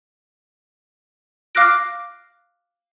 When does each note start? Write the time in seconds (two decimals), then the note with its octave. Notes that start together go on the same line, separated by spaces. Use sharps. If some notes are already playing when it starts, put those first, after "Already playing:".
1.55 F5 D6 F6 F#6 A#6 D7